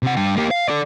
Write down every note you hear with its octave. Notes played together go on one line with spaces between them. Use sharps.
C3 F#5
G2 G5
A#3 G4
F5
A4 D5